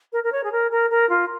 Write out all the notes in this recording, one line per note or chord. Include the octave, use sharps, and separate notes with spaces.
A#4
A#4
C#5
G#4
A#4
A#4
A#4
F4